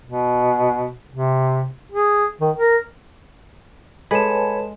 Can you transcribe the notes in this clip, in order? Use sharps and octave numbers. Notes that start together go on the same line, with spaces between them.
B2
C3
G#4
D#3
A#4
G#3 A4 B4 C#5 G#5 A5 B5 E7